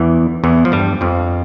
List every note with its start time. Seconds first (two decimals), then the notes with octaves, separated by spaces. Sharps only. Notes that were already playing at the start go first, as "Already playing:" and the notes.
Already playing: E2 E3
0.44 E2 E3
0.65 F3
0.72 G2 G3
1.01 F2 F3